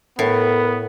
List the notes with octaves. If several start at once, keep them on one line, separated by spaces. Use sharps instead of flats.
A2 B3 A4 A#4